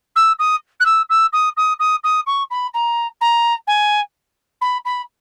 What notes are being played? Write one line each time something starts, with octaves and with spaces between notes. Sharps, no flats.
E6
D#6
F#6
E6
E6
D#6
D#6
D#6
D#6
C#6
B5
A#5
A#5
G#5
B5
B5